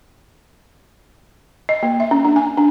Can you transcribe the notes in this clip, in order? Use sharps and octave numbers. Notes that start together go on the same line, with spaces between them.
D#5
A#3
E5
C#4
D4
G#5
D4